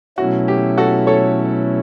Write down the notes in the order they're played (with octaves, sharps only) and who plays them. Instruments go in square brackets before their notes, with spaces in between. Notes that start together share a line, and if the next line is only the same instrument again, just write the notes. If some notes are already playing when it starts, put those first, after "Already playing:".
[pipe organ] B2 F#3 A3 C#4 E4 [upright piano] F#4
[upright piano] G4
F#4 A4
A4 C#5